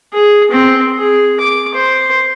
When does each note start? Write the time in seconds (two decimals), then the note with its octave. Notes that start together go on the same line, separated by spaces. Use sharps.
0.13 G#4
0.51 C4
0.98 G#4
1.40 D6
1.75 C5